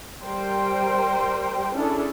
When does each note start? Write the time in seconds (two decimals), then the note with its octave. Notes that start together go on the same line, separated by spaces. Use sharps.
0.23 G3 A#4 C5 G5
1.74 C#4 D4 E4 G#4 A4